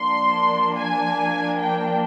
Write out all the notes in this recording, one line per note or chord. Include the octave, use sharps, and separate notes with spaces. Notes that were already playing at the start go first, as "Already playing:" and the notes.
Already playing: F3 A#3 D4 C6
G#5
G5